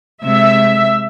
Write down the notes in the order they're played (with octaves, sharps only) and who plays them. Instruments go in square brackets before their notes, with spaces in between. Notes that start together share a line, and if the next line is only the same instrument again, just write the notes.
[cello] C3 G#3 [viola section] E5